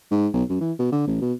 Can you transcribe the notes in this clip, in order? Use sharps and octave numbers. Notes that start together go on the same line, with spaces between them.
G#2
B1
F#2
E3
B2
D3
A1
B2